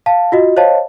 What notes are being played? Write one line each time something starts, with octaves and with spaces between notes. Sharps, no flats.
F5 A5
F4 F#4 D#5
C5 C#5 D#5 F5 A5